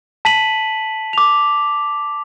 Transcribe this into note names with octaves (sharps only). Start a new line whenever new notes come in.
A5 B6 D#7 F#7
D6 F7